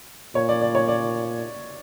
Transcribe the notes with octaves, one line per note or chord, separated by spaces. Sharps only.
A#2 C#5
D5
D5
C#5
D5